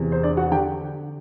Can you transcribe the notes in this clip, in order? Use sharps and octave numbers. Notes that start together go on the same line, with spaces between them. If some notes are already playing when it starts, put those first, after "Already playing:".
Already playing: E2 C3 E3
C5
D4 D5
F#4 F#5
D3 G4 G5